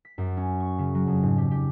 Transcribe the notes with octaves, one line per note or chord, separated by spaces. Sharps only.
B6
F#2
C#4
C#6
C#3
F#3
F2
G#2
G4
G4